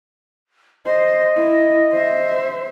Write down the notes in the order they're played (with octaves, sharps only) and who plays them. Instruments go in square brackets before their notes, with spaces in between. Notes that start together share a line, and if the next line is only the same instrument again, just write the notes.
[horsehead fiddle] C5 [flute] D#5
[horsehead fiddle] E4
C5 E5